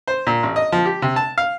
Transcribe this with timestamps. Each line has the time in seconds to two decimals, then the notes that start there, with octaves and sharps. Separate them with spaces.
0.07 C5
0.27 A#2
0.43 A1
0.56 D#5
0.72 F3
0.86 G4
1.02 C3
1.16 A5
1.38 F5